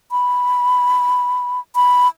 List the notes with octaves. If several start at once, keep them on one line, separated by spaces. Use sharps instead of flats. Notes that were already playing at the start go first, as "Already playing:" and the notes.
B5
B5